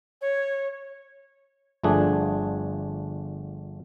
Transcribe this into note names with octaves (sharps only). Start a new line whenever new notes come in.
C#5
G1 F3 A3 D4 G#4